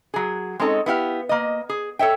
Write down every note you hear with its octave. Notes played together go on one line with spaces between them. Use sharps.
F#3 G#4
G#3 C4 C#4 D#4 A4
B3 E4 G4 F5
A#3 D#5
G#4
A4 C#5 E5 G5